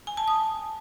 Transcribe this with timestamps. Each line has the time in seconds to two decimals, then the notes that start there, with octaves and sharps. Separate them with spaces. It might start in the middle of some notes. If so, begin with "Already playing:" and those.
0.07 G#5
0.17 A5
0.28 D#6